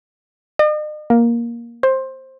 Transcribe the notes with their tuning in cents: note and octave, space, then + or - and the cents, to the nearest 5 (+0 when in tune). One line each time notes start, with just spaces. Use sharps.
D#5 -45
A#3 +10
C5 +15